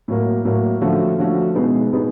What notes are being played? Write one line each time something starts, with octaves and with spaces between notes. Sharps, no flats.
A2 F#3 A#3
A2 F#3 A#3
D3 F3 A3 C#4 F#4
D3 F3 A3 C#4 F#4
B2 G#3 B3 D#4
B2 G#3 B3 D#4